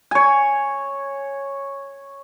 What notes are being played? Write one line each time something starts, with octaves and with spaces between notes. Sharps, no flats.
C#5 G#5